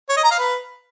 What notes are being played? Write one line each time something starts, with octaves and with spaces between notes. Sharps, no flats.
C#5
D#5
A#5
F5
B4